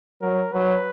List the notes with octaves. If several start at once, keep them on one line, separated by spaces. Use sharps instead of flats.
F#3 A#4
F#3 B4